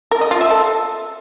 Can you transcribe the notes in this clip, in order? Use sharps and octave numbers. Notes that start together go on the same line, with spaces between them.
A#4
D#5
F4
E5
A4